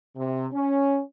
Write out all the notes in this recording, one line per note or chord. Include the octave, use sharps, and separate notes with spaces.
C3
C#4